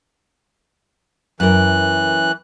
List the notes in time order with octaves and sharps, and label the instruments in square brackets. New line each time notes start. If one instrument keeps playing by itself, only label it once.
[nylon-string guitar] F#2 A#4 [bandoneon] E3 F#6